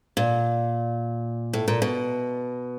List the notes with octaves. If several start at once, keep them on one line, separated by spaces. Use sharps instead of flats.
A#2
A2
A#2
B2